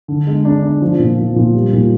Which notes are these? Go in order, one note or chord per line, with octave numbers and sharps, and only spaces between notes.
D3
G#3
D4
D4
F3
A#2
F3
A#2
G3
A#2